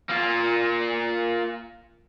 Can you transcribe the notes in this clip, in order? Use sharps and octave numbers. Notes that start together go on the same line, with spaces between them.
A#3 F4